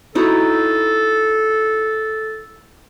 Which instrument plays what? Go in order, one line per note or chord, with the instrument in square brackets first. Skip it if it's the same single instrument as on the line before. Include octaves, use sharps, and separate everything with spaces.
[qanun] D#4 E4 F#4 [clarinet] A4